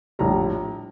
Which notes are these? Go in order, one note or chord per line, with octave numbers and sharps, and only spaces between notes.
A#1 A2 G3 A#5